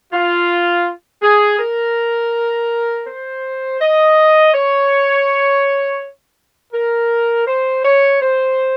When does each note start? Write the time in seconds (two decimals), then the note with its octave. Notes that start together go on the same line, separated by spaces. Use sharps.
0.13 F4
1.22 G#4
1.59 A#4
3.07 C5
3.81 D#5
4.54 C#5
6.73 A#4
7.47 C5
7.85 C#5
8.22 C5